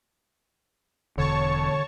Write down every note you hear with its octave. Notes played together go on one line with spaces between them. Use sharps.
E1 D3 C#5 A5 C#6